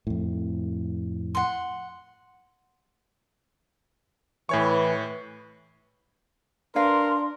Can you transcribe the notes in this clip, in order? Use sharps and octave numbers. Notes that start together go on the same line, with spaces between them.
F2 A2
F#5 C6
A2 E3 C#5 C#6
D4 A#4 B4 F5 C6